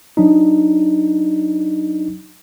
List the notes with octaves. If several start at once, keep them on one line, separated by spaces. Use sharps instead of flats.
F#3 D4 D#4